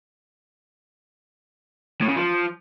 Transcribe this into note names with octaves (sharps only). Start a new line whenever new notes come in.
A2
C#3
F3